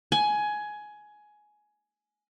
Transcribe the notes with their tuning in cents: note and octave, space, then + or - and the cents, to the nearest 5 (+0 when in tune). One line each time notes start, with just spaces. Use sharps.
G#5 +15